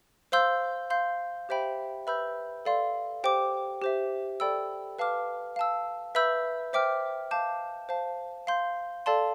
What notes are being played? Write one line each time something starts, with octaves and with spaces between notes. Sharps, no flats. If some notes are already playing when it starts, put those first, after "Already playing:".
C5 F5 C6 E6 G6
F5 C6 G6
G4 C5 E5 G5 B5
B4 E5 B5 E6 G6
A4 D5 F5 C6
G4 C5 G5 D6
G4 C5 E5
A4 D5 G5 B5 E6
B4 F5 A5 D6 F6
F5 A5 E6
B4 E5 B5 E6 G6
C5 E5 G5 D6 F6
F5 A5 D6 G6
C5 F5 A5
F5 C6 G6
A4 D5 F5 A5 C6